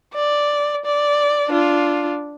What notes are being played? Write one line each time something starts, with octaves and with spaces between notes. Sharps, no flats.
D5
D5
D4 F4